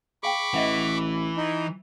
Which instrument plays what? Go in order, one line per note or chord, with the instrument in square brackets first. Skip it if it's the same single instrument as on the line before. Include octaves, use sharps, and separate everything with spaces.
[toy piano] G#4 F5 G5 [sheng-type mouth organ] B5 C#6 D6
[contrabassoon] A1 [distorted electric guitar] E3 [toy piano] D#5 E5 F#5
[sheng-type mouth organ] D#4